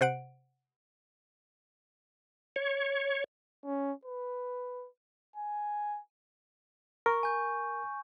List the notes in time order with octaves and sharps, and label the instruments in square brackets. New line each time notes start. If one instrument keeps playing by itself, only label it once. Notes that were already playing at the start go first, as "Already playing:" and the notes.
[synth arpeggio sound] C3 C5 F#5 D7
[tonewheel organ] C#5
[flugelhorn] C#4
B4
G#5
[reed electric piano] A#4 [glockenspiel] C#6
[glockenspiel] G#5 G6